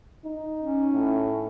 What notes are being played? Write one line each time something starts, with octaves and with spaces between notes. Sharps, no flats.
D#4
C#4
A2